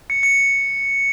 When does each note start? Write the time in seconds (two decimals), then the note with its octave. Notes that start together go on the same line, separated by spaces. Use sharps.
0.10 C#7
0.23 C#7